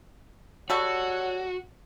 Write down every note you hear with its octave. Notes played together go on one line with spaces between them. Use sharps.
G3 F#4 A4 C#5 F#5 C#6